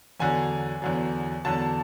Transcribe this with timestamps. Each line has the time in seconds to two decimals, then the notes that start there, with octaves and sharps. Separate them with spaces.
0.20 E2 D3 F#3 G#5
0.82 E2 D3 F#3
1.45 E2 D3 F#3 A5